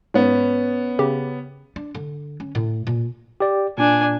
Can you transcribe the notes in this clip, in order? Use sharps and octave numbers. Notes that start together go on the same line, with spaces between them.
G#2 B3 C#4
C#3 G4
D4
D3
C#4
A2
A#2
G4 D5
A#2 D4 G#5